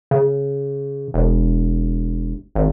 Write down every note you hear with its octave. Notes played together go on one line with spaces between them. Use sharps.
C#3
E1
G#1